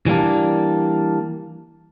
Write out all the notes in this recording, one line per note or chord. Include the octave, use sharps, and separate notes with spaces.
E3 G3 A#3 D4